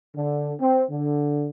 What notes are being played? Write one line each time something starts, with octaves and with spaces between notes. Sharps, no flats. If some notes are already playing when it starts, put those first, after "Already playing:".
D3
C4
D3